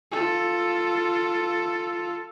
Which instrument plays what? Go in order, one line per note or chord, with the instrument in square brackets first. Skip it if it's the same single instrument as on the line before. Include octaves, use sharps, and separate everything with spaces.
[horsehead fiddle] F4 A4